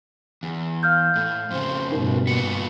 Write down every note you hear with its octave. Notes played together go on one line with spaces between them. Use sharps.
E2
F5 F6 G6
A2
F2 C#3 C5
G2 B2 D#4 A#4
A#2 B3 C#7